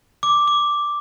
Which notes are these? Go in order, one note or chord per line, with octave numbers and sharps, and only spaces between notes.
D6
D6